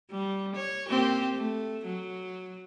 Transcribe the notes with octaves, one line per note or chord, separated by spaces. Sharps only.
G3
C#5
A#3 C4 G4
A3
F#3